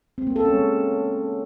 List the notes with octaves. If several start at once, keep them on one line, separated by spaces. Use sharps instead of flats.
C4
A#3
A4
C#4
G#3